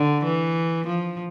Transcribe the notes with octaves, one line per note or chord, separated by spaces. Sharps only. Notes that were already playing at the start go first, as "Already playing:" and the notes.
Already playing: D3
E3
F3